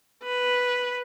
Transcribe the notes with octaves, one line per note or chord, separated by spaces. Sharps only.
B4